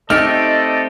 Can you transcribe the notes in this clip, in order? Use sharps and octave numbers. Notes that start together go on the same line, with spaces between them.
A3 C4 D#4 G4 A4 D5 D#5 F6